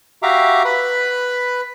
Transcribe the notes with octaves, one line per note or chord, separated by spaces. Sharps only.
F#4 G4 E5 F5 A#5 D6
B4 B5